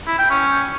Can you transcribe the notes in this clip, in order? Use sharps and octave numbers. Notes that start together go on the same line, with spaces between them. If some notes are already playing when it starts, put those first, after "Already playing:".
E4
G5
C#4